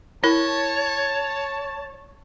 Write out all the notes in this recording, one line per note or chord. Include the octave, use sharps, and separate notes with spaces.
E4 A#4 C#5 A5